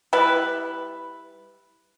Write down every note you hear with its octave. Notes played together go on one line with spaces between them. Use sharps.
G3 E4 B4